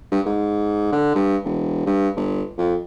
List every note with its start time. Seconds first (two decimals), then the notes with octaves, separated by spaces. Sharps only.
0.12 G2
0.26 G#2
0.93 D3
1.15 G2
1.45 E1
1.86 G2
2.16 G1
2.58 F2